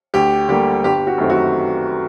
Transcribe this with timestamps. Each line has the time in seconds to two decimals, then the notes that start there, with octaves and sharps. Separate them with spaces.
0.14 D2 G4
0.48 D3 G3 A#3 G4
0.84 G1 G4
1.07 F#4
1.18 F#2 D#3 A3 C4
1.30 F#4